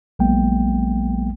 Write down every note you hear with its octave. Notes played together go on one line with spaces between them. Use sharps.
A#1 F#3 G#3 A#3 B3 G5